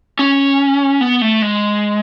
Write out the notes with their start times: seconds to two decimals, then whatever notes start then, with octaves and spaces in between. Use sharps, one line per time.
0.19 C#4
1.01 B3
1.22 A3
1.42 G#3